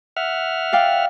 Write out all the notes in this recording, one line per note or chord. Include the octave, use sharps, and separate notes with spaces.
E5 F#5 F6
D5 F5 G5